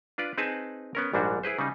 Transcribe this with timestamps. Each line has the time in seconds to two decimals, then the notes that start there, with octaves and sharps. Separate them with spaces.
0.18 D4 F4 B4 D5
0.38 C4 D#4 G#4 B4 G#5 A5
0.95 B3 C#4 A#4
1.13 A#1 G#2 G3 D4 F#4
1.43 E4 G#4 B4 C5
1.59 C#3 G3 D#4